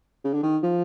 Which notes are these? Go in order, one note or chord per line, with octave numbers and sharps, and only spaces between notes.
C#3
D3
D#3
F3